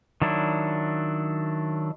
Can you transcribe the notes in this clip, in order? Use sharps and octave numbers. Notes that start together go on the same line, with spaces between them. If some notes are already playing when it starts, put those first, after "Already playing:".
D#3 F#3 D4 E4